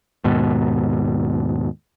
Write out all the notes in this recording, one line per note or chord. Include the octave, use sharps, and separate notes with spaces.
D#2 G#2 B2